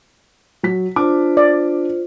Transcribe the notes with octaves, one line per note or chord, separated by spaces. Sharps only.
F#3 B6
D4 F4 C5 D6
D5